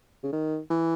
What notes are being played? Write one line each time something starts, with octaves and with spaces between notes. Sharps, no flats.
C#3
D#3
E3